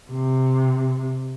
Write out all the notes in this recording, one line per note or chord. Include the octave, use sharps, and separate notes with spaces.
C3